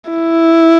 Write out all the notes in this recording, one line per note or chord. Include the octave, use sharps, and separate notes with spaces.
E4